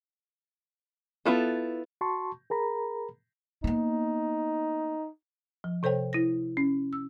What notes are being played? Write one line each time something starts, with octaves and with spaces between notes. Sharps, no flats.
B3 E4 F4 A4
F#4 A5 C6 C#6
G#4 A#4 A#5 B5
A#3 B3 D#4
F3
C3 A4 C5 C#5 G5
E4 A#6
C#4
E6